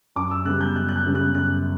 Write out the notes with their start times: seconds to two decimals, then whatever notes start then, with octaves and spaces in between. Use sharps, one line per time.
0.16 F#2 D6
0.31 E6
0.45 C#3 G3 B3 F#6
0.61 G6
0.75 F#2 F#6
0.88 F#6
0.96 G6
1.06 C#3 G3 B3
1.15 F#6
1.35 F#2 F#6